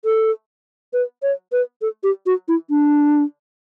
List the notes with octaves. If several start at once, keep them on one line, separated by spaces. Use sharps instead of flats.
A4
B4
C#5
B4
A4
G4
F#4
E4
D4